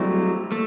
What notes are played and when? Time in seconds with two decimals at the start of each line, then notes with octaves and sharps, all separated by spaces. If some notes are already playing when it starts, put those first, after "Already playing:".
Already playing: F#3 G3 A3 C4 E4
0.52 A3